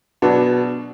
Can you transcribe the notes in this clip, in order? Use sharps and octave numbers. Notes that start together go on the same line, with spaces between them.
B2 F#3 B3 D4